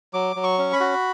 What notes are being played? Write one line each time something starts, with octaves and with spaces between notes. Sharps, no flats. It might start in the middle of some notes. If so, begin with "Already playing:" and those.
F#3 D6
F#3
C#6
C#4
B5
F#4